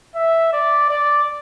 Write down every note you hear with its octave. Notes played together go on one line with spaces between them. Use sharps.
E5
D5
D5